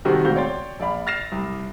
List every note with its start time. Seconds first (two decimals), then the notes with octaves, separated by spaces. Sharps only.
0.05 C3 D#3 G3 F#4 A4 C5
0.24 E1 A2 C4 F#4 F5 G6
0.36 C#5 D5 G5 C6 A6
0.80 A#1 D5 F5 B5
1.07 F6 A6 A#6 C7 E7
1.32 C2